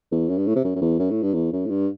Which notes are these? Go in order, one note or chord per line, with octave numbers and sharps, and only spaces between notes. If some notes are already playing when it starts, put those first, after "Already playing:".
E2
F#2
G2
A2
C3
F#2
F#2
E2
F#2
A2
G2
E2
F#2
A2
G2